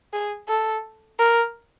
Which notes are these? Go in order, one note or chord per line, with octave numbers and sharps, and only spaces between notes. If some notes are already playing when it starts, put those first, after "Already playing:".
G#4
A4
A#4